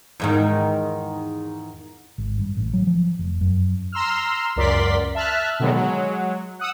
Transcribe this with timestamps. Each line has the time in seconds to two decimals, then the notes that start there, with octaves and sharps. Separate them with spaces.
0.20 E2 G#2 D#3
2.18 G#1
2.38 G2
2.57 A1
2.73 F#3
2.87 F3
3.19 F1
3.41 F#2
3.92 A#5 C6 E6 F6
4.56 C#2 F#2 A#4 D5 C6 B6
5.15 E5 A5 F6 F#6
5.60 B2 D3 D#3 F#3 G#3 A3
5.76 F#3 G#3
6.59 F#5 D#6 E6